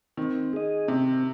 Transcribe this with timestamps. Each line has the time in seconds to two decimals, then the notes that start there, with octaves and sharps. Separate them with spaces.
0.17 D#3 C4
0.53 G#4 D#5
0.88 C3 C4